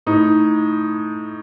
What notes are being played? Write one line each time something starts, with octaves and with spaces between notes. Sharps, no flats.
A2 D#4